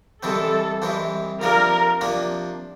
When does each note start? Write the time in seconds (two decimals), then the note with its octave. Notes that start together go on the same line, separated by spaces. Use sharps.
0.23 C2 C3 E3 G#3 C4 A4
0.82 C2 C3 E3 G#3 C4
1.41 C3 F3 A#3 D4 A#4
2.01 C3 F3 A#3 D4